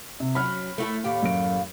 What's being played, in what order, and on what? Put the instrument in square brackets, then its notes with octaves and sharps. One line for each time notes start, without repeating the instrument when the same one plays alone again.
[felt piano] C3
[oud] F#3 C#4 [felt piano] B5 F6
[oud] A3 E4 A4
[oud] D#2 A2 G4 [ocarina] F5
[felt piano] F#2 D7